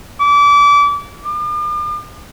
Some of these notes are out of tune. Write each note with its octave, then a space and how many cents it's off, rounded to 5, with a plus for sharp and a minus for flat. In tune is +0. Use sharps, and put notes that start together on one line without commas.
D6 -30
D6 +45